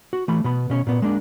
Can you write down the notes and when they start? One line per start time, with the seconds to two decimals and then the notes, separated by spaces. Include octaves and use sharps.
0.13 F#4
0.28 E3 A3 B5
0.44 B2 B3 B5
0.70 B2 C#4 C#5
0.87 A#2 B3
1.02 G#3 A#3 D4